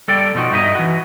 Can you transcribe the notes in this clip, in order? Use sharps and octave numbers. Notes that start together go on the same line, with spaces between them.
G3 A4 D5 G5
B2 F3 D#4 F#4
G2 D#4 E4 D#5
E3 F#4